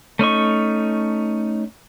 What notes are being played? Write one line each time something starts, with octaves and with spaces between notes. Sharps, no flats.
A3 C#4 D#4 C#6